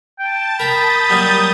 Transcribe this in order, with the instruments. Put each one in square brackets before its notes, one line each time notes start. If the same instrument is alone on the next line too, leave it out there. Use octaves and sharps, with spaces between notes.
[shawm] G5 [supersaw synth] A5 A6
[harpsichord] A#4 G5 [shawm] B5 [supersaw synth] D#6 G6 A6
[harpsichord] F#3 G3 A#3